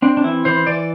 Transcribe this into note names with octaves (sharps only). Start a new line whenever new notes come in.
C4 D4
D4
E3 E4
E3 C5
E3 D5